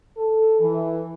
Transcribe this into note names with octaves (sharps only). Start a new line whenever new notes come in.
A4
E3